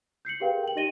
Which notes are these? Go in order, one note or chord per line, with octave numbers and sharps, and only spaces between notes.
G6 C7 C#7 F#7
G4 G#4 A#4 B4 F5 G5
G5 F#7
D#4 G4 D#5 A#6 D#7 G7